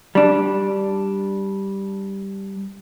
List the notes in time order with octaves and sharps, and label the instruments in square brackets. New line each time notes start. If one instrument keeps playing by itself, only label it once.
[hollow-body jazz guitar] G3 D4